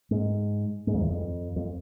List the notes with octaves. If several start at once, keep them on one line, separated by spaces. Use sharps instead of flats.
G#2
G#2
F2
E2
F2
F2